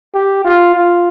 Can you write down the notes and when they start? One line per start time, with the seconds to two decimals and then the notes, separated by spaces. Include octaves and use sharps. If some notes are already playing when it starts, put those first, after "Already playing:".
0.14 G4
0.44 F4
0.74 F4